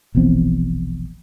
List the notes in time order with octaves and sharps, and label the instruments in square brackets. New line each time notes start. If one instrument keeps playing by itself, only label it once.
[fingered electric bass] E1 A#1 E2 C4